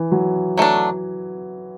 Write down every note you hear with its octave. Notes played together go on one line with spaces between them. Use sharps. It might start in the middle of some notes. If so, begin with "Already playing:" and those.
Already playing: E3
F#3
F#3 A3 D4